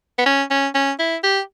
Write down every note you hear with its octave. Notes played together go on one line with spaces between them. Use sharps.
B3
C#4
C#4
C#4
E4
G4